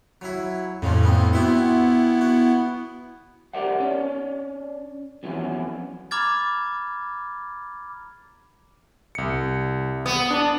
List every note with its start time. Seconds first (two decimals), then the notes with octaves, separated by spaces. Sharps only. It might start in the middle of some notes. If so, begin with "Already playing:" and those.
0.21 F#3 E4
0.82 F2 A2 C#3 F3
1.03 B3 C4
1.33 B3 C4 E4 F#4 E5
2.21 F#4
3.54 G4 A#4 C5 D5 E5 F#5
3.80 C#4 D4 C#5 D5
5.23 F2 E3 F#3 B3 C#4 E4
6.11 A#5 B5 D6 F6 G#6 A6
9.15 C2 C#7
10.06 B3 D#6
10.31 D4 A5